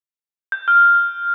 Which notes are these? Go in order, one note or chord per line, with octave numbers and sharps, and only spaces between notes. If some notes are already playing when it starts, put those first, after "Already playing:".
G6
F6